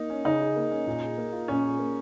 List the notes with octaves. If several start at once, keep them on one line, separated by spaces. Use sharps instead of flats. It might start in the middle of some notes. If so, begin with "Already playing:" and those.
Already playing: A#3 D#4
C#4
C#3 D#4
G#4
A#3
C#4
A#2
G#4
A#3
F4
A#2 C#4
G#4
A#3